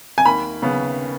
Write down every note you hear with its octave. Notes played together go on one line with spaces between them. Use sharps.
G#5
D#2 B5
C#3 B3